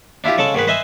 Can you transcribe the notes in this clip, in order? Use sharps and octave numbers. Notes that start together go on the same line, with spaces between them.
D4 E4 F4 G4
C#3 G#3 A4 A5
G#2 D#3 G#4 B4
B4 C5 D#5 E5 G#5